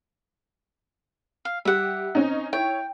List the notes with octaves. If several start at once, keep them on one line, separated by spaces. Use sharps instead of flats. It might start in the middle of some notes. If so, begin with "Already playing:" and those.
F5
G3 G4 E5 F#5
C4 C#4 D#4
E4 C#5 G5